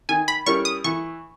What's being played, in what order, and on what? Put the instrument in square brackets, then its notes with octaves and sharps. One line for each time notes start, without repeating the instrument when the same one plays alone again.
[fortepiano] D#3 [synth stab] G#5
[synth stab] B5
[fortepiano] G3 C#4 E4 A#4 [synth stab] C#6
[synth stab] D#6
[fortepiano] E3 [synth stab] C#6